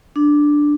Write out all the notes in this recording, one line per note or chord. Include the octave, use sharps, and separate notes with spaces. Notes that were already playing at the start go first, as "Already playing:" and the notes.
D4